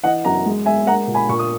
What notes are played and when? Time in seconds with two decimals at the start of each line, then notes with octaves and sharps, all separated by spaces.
0.04 E3 D#5 F#5
0.25 F#2 F#5 A#5
0.46 G#3
0.66 G#3 E5 G#5
0.87 A#3 F#5 A#5
1.08 A#2
1.14 G#5 B5
1.29 A#2 C#6
1.39 D#6